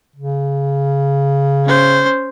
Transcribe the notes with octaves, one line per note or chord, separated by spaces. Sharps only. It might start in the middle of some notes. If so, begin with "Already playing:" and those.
C#3
C#4 C5